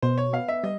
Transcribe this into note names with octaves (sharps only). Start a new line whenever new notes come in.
B2 C5
C#5
B3 F5
E5
G3 D#5